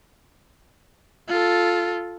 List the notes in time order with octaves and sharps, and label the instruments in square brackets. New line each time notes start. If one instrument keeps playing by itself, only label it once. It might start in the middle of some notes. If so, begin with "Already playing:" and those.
[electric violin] F4 A4